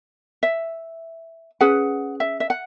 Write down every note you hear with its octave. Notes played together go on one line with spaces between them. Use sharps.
E5
C#4 G#4 B4 F#5
E5
E5
F#5